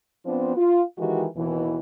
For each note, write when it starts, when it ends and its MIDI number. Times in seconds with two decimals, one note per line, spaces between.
0.25 0.52 53
0.25 0.52 59
0.25 0.52 60
0.25 0.52 62
0.25 0.52 65
0.56 0.82 65
0.97 1.25 51
0.97 1.25 52
0.97 1.25 56
0.97 1.25 66
0.97 1.25 67
1.35 1.79 39
1.35 1.79 47
1.35 1.79 52